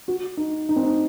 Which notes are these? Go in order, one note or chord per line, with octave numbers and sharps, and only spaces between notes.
F#4
D#4
D#4
C4
D#4